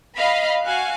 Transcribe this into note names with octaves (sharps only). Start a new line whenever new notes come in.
D#5 F5 B5
F#4 F5 G#5 F#6